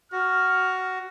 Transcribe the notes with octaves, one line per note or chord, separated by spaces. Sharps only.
F#4 F6